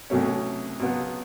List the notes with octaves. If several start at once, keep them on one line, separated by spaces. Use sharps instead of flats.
C2 B2 F#3 A3 C#4
C#2 B2 F#3 B3